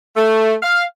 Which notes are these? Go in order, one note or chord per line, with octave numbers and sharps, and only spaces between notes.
A3
F5